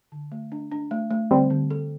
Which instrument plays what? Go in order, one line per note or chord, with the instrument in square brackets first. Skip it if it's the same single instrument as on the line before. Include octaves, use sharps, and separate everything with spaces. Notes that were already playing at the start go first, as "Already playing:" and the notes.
[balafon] D3
A3
D4
D4
A3
A3
[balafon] D3 [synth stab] G3 C4
[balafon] D3
A4